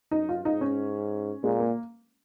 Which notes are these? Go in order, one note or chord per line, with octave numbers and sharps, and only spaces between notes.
F#2 D#4
F4
G#2 D#4
C#4
A#2 G#3
A#3